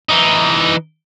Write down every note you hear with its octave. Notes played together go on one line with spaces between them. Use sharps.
E3 D#4